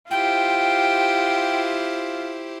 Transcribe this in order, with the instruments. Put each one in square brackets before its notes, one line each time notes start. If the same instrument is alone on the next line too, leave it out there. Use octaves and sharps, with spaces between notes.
[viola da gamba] E4 G4 C5 [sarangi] F4 [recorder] G5